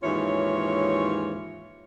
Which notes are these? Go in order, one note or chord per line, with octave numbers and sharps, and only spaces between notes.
D#2 G#2 E3 C#4 F4 C#5